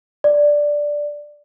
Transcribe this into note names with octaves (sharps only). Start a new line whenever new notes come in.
D5